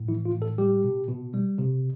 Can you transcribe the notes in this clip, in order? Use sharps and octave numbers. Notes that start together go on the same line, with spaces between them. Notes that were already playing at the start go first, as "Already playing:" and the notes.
Already playing: A2
E3 E4
F4
A2
A4
G3 G4
B2
B2
G3
C3